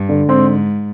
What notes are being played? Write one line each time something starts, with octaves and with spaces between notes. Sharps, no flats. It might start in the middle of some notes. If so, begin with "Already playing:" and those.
Already playing: G2
D3
G#2 C4